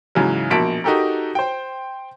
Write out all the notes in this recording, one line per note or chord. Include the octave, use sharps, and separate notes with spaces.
G#2 C#3 E3 F#3
A#1 B2 A#3 A5 B6 D7
D#4 F#4 G4 A4 A#4
C5 G5